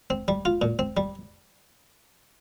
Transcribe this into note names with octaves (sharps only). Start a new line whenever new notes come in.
C4
G3
F4
A#2
C4
G3